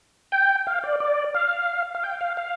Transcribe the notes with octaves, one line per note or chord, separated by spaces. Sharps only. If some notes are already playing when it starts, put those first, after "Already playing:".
G5
F5
D5
D5
F5
F5
G5
F5
F5